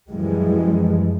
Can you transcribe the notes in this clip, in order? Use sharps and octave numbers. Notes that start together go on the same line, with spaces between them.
F#2 E3 F3 G3 G#3